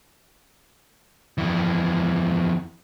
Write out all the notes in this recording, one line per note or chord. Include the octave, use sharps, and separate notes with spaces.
F2 E3